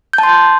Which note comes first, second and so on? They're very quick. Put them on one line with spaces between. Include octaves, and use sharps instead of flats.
G6 A5 C6